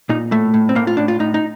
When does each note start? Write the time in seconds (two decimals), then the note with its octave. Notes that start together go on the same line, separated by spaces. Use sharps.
0.09 A#2 D#4
0.31 A2 A3
0.54 A2
0.69 C4
0.75 A2 A#3
0.87 F4
0.97 A2 D4
1.08 F4
1.20 A2 D#4
1.34 D#4